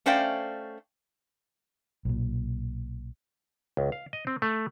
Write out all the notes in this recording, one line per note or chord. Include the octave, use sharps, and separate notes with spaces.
A3 C#4 C5 D5 F5 G5
B1 A#2
C#2
F5
D#5
C4
A3